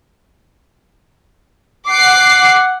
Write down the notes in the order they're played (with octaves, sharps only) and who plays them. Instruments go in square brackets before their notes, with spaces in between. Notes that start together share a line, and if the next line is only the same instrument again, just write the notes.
[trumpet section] F#5 [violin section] D6 C7